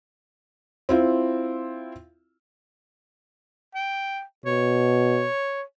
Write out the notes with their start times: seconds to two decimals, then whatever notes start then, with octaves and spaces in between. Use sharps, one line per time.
0.89 C4 E4 F4
3.75 G5
4.46 B2 C#5